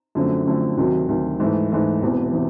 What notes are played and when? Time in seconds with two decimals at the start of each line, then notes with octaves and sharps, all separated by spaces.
0.15 F#2 D3 F3 A3 C4
0.46 F#2 D3 F3 A3 C4
0.77 D2 C3 D#3 F#3
1.09 D2 C3 D#3 F#3
1.40 G#2 E3 A3
1.71 G#2 E3 A3
2.02 E1 E2 C3 E3
2.33 C3 E3